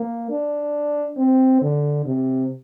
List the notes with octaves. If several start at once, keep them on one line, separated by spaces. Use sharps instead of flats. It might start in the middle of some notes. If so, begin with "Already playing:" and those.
Already playing: A#3
D4
C4
D3
C3